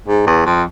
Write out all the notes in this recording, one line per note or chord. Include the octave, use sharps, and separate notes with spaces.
G#2
E2
F2